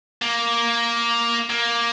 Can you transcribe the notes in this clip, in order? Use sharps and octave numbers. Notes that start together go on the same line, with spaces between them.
A#3
A#3